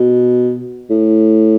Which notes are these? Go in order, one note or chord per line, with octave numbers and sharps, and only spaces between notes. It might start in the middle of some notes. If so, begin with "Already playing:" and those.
Already playing: B2
A2